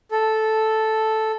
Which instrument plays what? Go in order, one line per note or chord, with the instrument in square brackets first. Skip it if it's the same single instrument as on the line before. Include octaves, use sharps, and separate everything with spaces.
[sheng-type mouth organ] A4